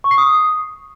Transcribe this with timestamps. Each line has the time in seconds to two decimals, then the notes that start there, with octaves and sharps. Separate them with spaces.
0.04 C#6
0.11 C7
0.18 D#6